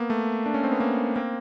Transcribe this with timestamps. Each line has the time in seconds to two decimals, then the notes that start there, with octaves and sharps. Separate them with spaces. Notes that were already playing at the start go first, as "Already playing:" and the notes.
Already playing: A#3 B3
0.10 A3
0.46 D4
0.54 C#4
0.63 C4
0.72 B3
0.80 A#3
1.16 A#3 C4